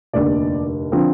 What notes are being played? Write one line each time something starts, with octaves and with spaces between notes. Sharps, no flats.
F1 D#2 D3 D5
D3 F3 C4